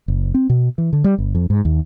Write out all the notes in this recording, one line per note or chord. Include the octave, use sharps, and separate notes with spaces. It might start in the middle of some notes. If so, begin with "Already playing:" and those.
F#1
C4
B2
E3
D3
G3
G1
F2
G#2
D#2